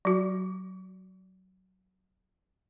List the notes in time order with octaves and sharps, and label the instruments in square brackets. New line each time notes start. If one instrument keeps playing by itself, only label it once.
[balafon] F#3 F#4